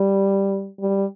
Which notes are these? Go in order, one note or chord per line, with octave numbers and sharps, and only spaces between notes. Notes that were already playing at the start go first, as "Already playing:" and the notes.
Already playing: G3
G3